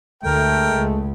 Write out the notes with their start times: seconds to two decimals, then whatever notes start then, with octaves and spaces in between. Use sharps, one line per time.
0.23 D2 G#3 A3 A#4 G5
0.76 C#2 C#3